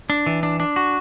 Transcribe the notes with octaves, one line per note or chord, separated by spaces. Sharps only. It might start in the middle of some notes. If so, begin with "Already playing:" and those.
D4
E3
D4
D4
F#4